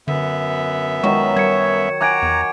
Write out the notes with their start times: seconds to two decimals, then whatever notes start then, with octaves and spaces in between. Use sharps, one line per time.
0.08 F#2 D3 B3 E5
1.04 D#3 F#3 G#3 C#6
1.36 G3 G#6 C#7
2.01 F#5 G#5 A#5 D6 G#6 D7
2.22 E2